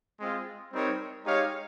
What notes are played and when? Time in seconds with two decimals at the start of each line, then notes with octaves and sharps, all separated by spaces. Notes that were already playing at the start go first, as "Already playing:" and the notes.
0.19 G#3 C4 F4
0.72 G3 C4 D#4 A#4 C#5
1.25 G#3 D#4 G4 C#5 F5